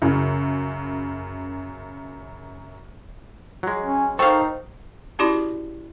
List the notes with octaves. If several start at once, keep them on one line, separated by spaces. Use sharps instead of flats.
F#2 C#3
F#3 G#3
C#4
D#3 D#4 A4 C5 F5 C#6
C#4 E4 F#4 G4 D5 C6